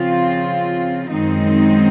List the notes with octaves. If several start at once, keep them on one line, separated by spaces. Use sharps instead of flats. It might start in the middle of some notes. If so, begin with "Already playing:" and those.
Already playing: C#3 F3 C4 F4
F#2 D#3 G#3 C4 D#4